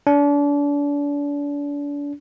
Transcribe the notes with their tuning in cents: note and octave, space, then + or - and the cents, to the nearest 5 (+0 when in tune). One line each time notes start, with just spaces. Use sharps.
D4 -35